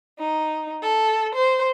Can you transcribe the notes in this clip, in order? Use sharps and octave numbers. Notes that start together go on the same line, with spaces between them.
D#4
A4
C5